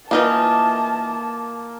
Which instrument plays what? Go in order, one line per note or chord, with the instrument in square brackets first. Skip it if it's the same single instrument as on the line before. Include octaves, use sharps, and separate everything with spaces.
[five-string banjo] E3 D#4 F4 [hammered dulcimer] A#3 [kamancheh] A5